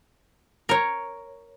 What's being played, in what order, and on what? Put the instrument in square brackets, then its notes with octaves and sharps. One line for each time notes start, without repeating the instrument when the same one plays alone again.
[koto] A#4 C#5